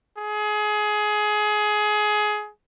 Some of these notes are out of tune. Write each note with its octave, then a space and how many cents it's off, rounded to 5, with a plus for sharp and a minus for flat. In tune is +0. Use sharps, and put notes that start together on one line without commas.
G#4 +20